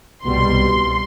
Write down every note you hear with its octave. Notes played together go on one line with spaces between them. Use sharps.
C2 B2 G3 C6